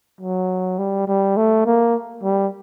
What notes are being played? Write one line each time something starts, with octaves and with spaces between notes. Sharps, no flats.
F#3
G3
G3
A3
A#3
G3